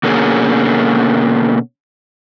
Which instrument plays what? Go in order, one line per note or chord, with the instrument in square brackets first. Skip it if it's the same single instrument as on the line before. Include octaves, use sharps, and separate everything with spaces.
[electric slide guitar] B2 D3 A#3 C#4 G#4